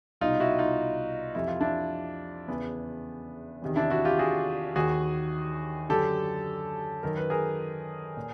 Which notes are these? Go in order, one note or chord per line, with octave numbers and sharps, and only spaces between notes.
C2 B2 D#4 F4
E4 F#4
D#4 F4
F2 C3 E3 E4
F4
D4 E4
E2 C#3 E3 B3
E2 C3 D#3
D4 E4
E4 F#4
F4 G4
F#4 G#4
D#2 D#3 F#4 G#4
F#2 D3 G4 A4
F#2 D#3 A#4
B4
G#4 A#4
A#2